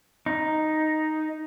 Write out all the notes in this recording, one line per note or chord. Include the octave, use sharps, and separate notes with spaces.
D#4